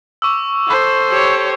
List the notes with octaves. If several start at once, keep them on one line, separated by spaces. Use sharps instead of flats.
C#6 D6 E6
A4 C5
G4 C#5